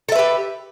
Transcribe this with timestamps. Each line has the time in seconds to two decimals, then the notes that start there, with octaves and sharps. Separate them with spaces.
0.09 A4
0.12 E5
0.15 B4
0.19 G4